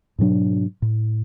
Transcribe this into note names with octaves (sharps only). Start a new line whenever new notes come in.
G#2 B2 F#3 D4
A2